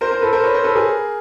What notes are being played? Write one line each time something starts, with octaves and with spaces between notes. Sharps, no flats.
A#4 C5
A#4 C5
A4 B4
A#4 C5
B4 C#5
A#4 C5
A4 B4
G#4 A#4